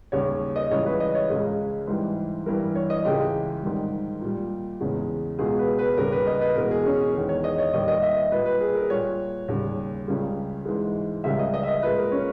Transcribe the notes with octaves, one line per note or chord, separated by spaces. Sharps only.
D#2 C#3 G3 C#5
D#5
C#2 C#3 E3 G3 C#5
B4
D#5
C#5
C#2 C#3 G#3
G#2 E3 G3
G2 E3 G3 A#4
C#5
D#5
C#2 C#3 E3 G#3 G4
G#2 D#3 G3
A#2 G3
E2 C#3 G#3
C#2 B2 G#3 G#4
B4
B4
D#2 C#3 G3 A#4
B4
D#5
B4
E2 B2 G#3 A#4
G#4
C#4
E2 D#3 G#3
C#5
D#5
C#5
D#2 D#3 G3 D#5
D#5
E5
D#5
A#2 G3 B4
B4
G#4
A#4
A#2 G3 C#5
D#2 C#3 G3
C#2 C#3 G3
G#2 E3 G#3
C#2 C#3 G3 E5
D#5
D#5
E5
D#5
A#2 G#3 B4
A#4
C#4